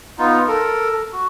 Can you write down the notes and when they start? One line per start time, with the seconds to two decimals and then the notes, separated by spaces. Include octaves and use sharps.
0.19 B3 D#4 F4
0.48 A4 A#4
1.13 F#4